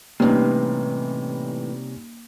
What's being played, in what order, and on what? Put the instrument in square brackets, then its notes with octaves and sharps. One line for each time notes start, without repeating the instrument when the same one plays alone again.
[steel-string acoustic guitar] A2 E3 [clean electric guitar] C3 [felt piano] G3 C#4 D#4 [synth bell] A#3